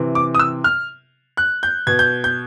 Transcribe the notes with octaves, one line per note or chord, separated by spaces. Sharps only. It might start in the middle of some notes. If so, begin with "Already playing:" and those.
Already playing: C3 E3
D6
D#6
E6
F6
F#6
G6
B2 G#6
G6
G6